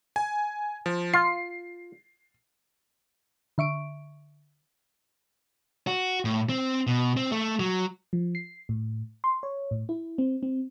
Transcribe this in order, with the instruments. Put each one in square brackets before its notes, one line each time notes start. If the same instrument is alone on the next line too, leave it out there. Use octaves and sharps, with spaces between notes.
[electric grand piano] G#5
F3
[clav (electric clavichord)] F4 [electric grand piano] C7
[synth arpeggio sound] D3 E5 C#6 D7
[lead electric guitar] F#4
A2
C4
B2
C4
A3
F#3
[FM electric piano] F3
C7
A2
C6
C#5
A2
E4
C4
C4